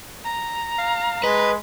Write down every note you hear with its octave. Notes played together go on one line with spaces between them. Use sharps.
A#5
F5
G#3 B4 D#5